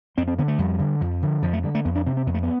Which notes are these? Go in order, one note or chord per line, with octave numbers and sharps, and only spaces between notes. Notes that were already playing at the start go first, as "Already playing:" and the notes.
F2 C4
C4
D3 B3
A3
F2 G3
D3
F2 F3
D3
F2 F3
A3
D3 G3
A3
F2 B3
D4
C3 C4
C4
F2 B3
A3
B3